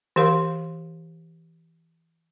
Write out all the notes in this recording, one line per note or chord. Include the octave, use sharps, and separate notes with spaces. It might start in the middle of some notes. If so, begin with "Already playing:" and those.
E3 G4 A#4 F5